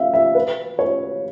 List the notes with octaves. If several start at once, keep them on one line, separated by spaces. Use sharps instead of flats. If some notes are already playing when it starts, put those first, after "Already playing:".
Already playing: E5 F5
E5
B4
C#5